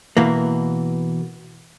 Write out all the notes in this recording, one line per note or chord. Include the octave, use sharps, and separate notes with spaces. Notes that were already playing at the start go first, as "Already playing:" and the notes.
B2 E3 A#3